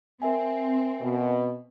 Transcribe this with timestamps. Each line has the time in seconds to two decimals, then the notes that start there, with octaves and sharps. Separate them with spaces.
0.22 C4 A#4 E5 G#5
1.01 B2